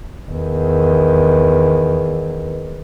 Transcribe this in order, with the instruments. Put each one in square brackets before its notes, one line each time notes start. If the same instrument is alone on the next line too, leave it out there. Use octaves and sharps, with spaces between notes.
[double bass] E2 D#3